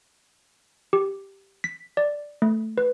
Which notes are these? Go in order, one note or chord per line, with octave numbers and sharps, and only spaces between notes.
G4
B6
D5
A3
B4